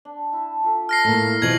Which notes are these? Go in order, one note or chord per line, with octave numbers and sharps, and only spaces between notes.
D4
E4 A5
F4 A4 E5
F6 A#6 C7
A2 A#3
B2 E3 F3 G#4 G#6 F#7